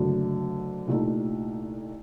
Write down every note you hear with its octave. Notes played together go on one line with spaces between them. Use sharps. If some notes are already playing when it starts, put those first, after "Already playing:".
Already playing: F#1 F#2 D3 F#3 A3
C2 A#2 A3 D#4